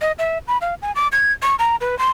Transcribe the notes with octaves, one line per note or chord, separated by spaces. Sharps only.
D#5
E5
B5
F5
G#5
D6
G#6
C#6
A#5
B4
C6